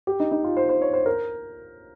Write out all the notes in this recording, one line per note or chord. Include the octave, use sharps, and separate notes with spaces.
G4
D#4
D#4
F4
C5
C5
C#5
C5
A#4